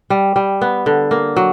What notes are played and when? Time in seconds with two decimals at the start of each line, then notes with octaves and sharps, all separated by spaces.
0.10 G3
0.36 G3
0.61 B3
0.86 D3
1.11 A#3
1.36 F#3